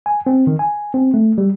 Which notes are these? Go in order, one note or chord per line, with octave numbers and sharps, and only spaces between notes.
G#5
C4
D#3
G#5
C4
A3
G3